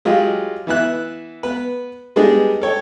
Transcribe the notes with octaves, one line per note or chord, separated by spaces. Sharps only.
F#3 G#3 F4 G4 D#5
E3 B3 E5 F#6
B3 B4
G3 G#3 B3 D4 D#4 G#4
A4 C#5 G5